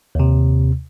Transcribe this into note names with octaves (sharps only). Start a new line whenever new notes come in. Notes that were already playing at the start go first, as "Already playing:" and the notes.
D#2 C3